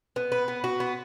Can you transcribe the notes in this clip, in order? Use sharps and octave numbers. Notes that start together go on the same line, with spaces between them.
B3
B4
B3
F#4
B3